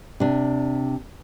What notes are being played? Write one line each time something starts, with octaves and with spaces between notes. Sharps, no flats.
C3 D4